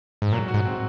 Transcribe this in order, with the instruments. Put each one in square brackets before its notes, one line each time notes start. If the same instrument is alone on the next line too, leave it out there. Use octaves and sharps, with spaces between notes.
[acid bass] G#2
[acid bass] A#2 [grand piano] F#3
[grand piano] F#4
[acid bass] G#2
[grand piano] C4